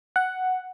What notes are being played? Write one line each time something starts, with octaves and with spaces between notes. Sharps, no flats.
F#5